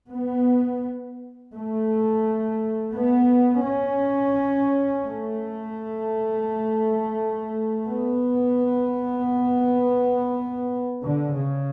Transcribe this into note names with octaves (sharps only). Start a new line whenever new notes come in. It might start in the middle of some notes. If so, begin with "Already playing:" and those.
B3
A3
B3
C#4
A3
B3
D3
C#3